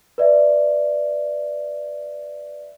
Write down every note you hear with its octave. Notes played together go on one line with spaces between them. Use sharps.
B4 D5 E5